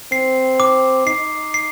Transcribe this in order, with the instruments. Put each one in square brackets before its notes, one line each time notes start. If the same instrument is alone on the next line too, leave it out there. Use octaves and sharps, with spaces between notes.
[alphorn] C4 [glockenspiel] C7
[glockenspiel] D6
[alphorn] D#4 [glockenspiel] C7
[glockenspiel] C7